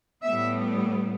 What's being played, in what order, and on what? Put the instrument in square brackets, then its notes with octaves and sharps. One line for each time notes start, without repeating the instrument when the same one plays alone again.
[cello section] A2 G3 B3 E5